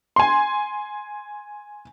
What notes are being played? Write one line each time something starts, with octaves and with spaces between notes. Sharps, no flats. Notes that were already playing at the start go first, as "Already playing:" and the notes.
G#5 C6